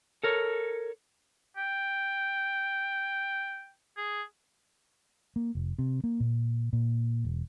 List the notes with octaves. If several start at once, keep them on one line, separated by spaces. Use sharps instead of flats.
A4 A#4 C#5
G5
G#4
A#3
F1
C3
A#3
A#2
A#2
E1